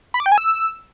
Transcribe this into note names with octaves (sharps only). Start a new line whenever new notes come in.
B5
D6
G5
G#5
E6